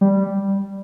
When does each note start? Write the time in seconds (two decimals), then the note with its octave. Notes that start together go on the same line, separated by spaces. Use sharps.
0.01 G3